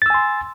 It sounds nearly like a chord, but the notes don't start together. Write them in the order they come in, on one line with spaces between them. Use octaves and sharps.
A6 E6 G#5 C6